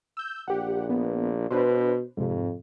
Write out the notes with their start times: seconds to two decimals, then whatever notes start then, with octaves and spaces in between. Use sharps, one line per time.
0.17 E6 G6
0.48 A#1 G4 F#5
0.90 B3
1.51 B2 D4 B4 C5
2.17 F2 G#2 C3